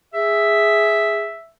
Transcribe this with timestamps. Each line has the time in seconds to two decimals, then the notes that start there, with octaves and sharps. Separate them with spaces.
0.14 G#4 E5